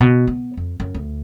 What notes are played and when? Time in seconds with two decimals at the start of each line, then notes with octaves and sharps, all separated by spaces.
0.01 B2
0.27 B3
0.57 F2
0.80 F#2
0.95 D2